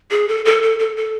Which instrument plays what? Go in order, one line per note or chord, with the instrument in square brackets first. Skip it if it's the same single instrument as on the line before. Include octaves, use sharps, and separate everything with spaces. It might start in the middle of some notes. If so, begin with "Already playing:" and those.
[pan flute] G#4
A4
A4
A4
A4
A4